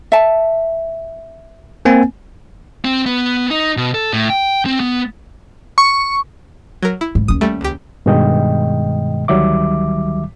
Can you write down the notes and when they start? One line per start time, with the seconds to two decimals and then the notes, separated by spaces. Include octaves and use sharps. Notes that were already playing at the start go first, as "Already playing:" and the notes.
0.12 E5 A5
1.85 A#3 C4 G#5
2.85 C4
3.06 B3
3.50 D#4
3.77 B2
3.94 A4
4.13 A2
4.30 G5
4.66 C4
4.80 B3
5.78 C#6
6.83 F#3 A#4
7.01 E4
7.15 G#2
7.28 D#2 C#4 D#6
7.41 G3 A3
7.61 C#2 G4
8.06 G2 B2 D#3 G#3 D#5 G5
9.28 D2 D#3 F#3 G3 E5 D6